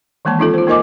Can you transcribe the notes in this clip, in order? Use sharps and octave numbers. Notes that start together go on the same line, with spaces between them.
D#3 E3 G#3 A#3 A5
C4 D#4 F4 A4
F4 C5
A#3 D#4 A#4 D#5 G#5 D6